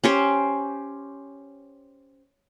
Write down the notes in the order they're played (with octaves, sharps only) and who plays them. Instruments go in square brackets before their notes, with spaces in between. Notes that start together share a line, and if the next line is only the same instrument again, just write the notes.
[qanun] C#4 G4 C5